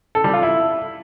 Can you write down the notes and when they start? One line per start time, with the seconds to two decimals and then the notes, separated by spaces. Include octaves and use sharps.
0.15 A4
0.24 G3
0.33 F4
0.43 E4